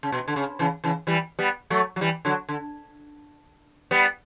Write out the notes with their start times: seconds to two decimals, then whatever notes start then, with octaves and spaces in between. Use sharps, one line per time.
0.03 C#3
0.12 B2
0.28 D3
0.36 C#3
0.59 C#3 E3
0.84 C#3 E3
1.07 E3 G3
1.39 G3 B3
1.70 F#3 A3
1.96 F#3
2.01 E3 G3
2.25 D3 F#3
2.49 D3
3.91 G3 B3